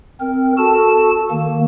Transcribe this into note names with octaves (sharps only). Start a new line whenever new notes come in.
C4 A#4
F#4 A4 A5
D#3 A#3